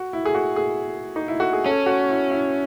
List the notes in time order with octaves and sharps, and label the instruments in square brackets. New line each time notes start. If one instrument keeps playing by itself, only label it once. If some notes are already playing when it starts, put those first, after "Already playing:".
Already playing: [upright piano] F#4
E4
G#4
F#4
G#4
D#4
E4
F#4
G#4
[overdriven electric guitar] C#4 [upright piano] A4
[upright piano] F#4
E4
E4